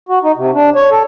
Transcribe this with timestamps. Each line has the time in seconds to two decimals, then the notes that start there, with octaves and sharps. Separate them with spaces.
0.09 F#4
0.23 D#4
0.37 C3
0.54 D4
0.76 C#5
0.91 A4